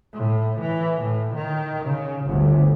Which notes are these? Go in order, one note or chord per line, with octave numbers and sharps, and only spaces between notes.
A2
E3
A2
D#3
C#3
G1 D2